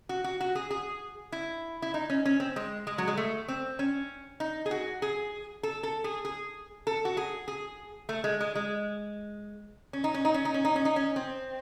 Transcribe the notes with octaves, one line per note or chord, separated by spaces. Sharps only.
F#4
F#4
F#4
G#4
G#4
E4
E4
D#4
C#4
C#4
C4
G#3
G#3
F#3
G#3
A3
C4
C#4
D#4
G#4
F#4
G#4
A4
A4
G#4
G#4
A4
F#4
G#4
G#4
A3
G#3
G#3
G#3
C#4
D#4
C#4
D#4
C#4
D#4
C#4
D#4
C#4
D#4
C#4
C4